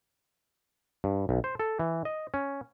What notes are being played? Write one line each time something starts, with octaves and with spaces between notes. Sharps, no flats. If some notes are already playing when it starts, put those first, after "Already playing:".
G2
B1
C5
A4
E3
D#5
C#4